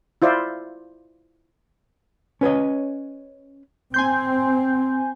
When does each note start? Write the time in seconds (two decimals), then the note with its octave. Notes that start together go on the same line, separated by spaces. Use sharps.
0.22 E4 F4 C5 D5 E5
2.41 C#4 B4 C#5 D#5
3.94 C4 G#5 C6 G6